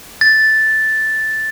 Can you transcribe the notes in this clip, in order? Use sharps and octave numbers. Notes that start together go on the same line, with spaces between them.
A6